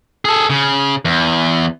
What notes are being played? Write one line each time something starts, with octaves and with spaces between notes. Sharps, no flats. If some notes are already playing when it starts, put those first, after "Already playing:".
G#4 A4
C#3
E2